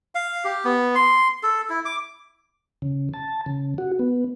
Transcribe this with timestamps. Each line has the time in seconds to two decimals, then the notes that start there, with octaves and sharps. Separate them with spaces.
0.15 F5
0.45 G4
0.65 B3
0.95 C6
1.43 A4
1.69 E4
1.85 D6
2.82 C#3
3.14 A5
3.46 C#3
3.78 F#4
3.99 B3